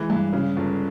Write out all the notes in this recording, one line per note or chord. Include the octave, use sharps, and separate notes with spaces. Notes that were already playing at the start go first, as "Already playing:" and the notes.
Already playing: E3 G#3
G2
C#3
G1